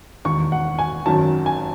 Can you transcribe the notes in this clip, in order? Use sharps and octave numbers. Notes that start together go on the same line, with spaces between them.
E1 D#2 D#3 C#6
F#5
G#5
G#1 F#2 D#3 F#3 A5
G#5